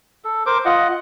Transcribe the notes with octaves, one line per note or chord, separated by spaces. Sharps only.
A4
A#4 C5 D6
F4 D#5 F#5